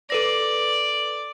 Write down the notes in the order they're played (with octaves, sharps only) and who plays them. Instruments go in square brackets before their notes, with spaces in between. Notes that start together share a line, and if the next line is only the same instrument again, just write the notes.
[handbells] A4 B4 A#6 [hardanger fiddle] D5